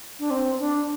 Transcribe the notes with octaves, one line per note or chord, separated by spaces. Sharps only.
D4
C4
D4